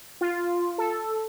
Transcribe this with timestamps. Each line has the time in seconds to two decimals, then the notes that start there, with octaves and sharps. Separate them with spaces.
0.21 F4
0.78 A4